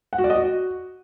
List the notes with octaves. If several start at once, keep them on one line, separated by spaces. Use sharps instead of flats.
F#5
F#4
D5
D#5
F#4